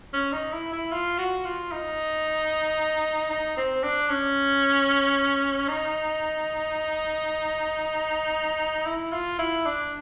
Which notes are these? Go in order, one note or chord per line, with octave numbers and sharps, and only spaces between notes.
C#4
D#4
E4
E4
F4
F#4
F4
D#4
D#4
C4
D4
C#4
D#4
E4
F4
E4
D4